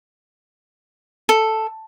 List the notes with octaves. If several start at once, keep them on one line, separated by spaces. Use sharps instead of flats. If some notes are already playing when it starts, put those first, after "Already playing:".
A4